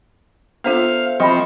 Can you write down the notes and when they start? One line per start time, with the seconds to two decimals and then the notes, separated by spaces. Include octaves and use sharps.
0.64 B3 D4 F4 A4 C5 E5 F5
1.20 F3 C4 D#5 G5 B5 C#6